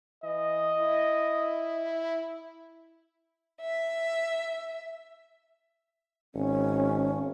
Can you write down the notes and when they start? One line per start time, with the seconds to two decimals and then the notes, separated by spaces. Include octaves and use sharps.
0.24 E3 D#5
0.79 E4
3.60 E5
6.35 G#1 C#4